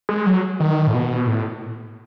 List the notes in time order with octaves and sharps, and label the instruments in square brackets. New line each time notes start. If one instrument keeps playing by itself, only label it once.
[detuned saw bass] G#3
F#3
D#3
A2
B2
A2